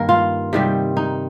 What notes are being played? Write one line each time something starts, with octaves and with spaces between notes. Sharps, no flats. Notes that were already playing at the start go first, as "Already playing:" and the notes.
Already playing: G2 D#3 A#3 A#4
F4
C3 D#3 G3
D#4